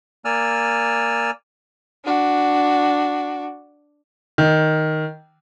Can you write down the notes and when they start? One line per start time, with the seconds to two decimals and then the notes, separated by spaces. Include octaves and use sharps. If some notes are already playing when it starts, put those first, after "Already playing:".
0.25 A#3 D5 G#5 E6 F6
2.05 D4 F#4
4.38 D#3